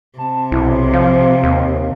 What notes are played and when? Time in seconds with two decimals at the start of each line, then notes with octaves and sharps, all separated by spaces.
0.18 C3 A5
0.52 B1 E4
0.93 F3 F5
1.44 D#2